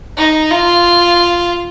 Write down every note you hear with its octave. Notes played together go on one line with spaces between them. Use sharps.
D#4
F4